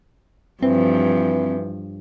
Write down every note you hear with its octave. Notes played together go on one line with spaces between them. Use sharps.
G2 E3 F3 C4